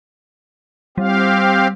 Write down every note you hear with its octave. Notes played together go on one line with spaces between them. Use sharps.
G3 C4 G4 F5